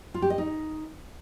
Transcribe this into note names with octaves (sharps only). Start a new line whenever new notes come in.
F4
G4
D#5
D#4